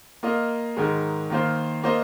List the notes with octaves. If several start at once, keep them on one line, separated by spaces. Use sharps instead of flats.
A#3 F4 A#4 D#5
G#2 D#3 G#3
D#3 A#3 F4 C5
A#3 F4 C5 D#5